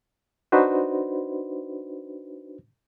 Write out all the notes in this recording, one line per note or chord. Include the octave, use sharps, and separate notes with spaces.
D4 D#4 F#4 B4 C5